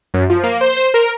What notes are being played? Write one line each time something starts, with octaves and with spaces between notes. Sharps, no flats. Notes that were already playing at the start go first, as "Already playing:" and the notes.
F#2
F3
A#3
C5
C5
A#4